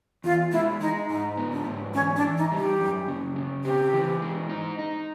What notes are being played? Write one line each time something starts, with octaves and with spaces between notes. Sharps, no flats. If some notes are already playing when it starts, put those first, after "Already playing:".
E2 F4
G#3 E4
G#3 D#4
G#2 D#4
B3
D4
G#2
E3 C#4
D4
E3
D#4
G3
G4
F#2
C#3
C#3
C4 G4
E3
G#3
D#4
D#4